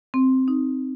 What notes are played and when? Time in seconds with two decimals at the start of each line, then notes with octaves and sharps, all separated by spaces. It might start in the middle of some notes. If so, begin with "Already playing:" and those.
0.14 C4
0.48 D#4